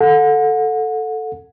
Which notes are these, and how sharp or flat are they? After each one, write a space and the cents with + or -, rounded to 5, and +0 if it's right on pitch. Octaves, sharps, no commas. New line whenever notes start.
A4 +0 F#5 -30